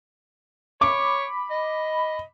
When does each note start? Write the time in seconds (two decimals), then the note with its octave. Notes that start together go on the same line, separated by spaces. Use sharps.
0.81 C#5 B5 D6
1.50 D#5